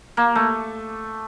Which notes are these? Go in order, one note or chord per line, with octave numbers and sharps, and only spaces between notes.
A#3
A3